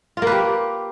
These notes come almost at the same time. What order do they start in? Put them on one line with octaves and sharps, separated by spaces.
F4 A#3 B4 G4